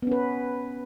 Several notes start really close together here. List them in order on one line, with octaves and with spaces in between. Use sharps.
B3 C#4 B4